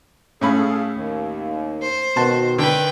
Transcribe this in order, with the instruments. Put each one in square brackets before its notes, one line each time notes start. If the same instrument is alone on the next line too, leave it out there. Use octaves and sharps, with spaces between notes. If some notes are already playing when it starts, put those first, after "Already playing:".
[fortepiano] A2 C#4 B5 [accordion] G#4 A4 F5
[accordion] D#2
[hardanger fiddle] C5
[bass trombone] B2 [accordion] D#3 [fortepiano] F#4 A5 C6
[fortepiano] D3 [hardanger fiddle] B4 G5